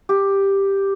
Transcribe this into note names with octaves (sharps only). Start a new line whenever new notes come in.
G4